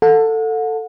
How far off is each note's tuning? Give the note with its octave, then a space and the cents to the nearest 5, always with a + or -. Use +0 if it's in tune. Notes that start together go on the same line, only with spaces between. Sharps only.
A4 +15 F#5 -35